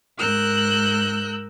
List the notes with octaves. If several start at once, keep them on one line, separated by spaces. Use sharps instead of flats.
G#2 A#4 E6 F#6 G6